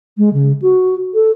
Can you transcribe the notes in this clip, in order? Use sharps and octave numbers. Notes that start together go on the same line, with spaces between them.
G#3
C#3
F#4
A4